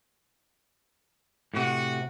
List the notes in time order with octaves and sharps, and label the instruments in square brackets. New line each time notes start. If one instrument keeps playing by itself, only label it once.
[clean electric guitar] A2 C3 [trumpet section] F#4